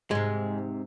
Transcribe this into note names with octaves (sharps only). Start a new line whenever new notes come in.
G#2 C3 G#3